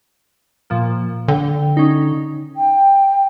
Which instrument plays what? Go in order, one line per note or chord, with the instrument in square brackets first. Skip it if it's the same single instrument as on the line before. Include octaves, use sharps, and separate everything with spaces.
[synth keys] A#2 F3 A#3
[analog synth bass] D3 [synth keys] G5
[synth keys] C#4 D#4
[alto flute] G5